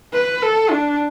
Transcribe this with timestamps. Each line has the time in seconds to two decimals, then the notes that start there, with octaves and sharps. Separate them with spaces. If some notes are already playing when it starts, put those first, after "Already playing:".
0.13 B4
0.42 A4
0.71 D4